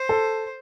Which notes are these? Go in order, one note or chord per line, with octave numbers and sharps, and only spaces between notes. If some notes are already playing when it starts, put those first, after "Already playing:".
Already playing: C5
A4